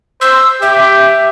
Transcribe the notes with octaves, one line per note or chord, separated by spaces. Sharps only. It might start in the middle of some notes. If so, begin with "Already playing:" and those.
C5 E6
G4 E5